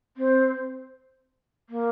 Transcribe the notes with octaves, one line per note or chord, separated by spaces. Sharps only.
C4
A#3